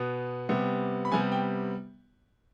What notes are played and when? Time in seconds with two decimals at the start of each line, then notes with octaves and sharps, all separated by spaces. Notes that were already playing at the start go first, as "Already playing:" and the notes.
Already playing: B2 B3
0.49 C3 G3 B3
1.05 B5
1.12 C3 G3 B3 G#5
1.32 G5